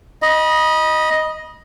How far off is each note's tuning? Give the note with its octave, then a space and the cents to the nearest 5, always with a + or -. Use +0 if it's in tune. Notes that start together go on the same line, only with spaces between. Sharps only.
D#5 +0 B5 -35